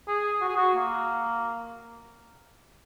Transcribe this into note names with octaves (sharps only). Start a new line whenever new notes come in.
G#4
F#4
G#4
F#4
A#3